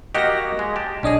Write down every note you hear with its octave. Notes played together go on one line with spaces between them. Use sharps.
A#3 F#4 G4 D#5 A#6
G#3
G4 A5
B1 C#4 D4 G#4 D#5